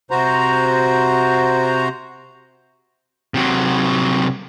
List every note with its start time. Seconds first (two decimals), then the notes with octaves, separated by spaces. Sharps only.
0.11 C3 F#4 C5 A#5
3.34 C3 F#3